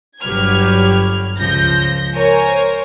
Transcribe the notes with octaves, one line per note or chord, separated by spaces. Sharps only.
G1 F#3 G4 B4 F6 G#6
C#2 F3 G6 A#6
A#4 C5 C#5 G#5